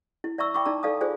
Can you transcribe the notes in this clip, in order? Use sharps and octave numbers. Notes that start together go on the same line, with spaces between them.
E4
D5 E5 A#5 C#6 E6
E5 G5 B5 C#6 D6
D#4 D5 A5 A#5
D#4 A4 D5 F5 A5 D#6
F4 G#4 C5 D5 G#5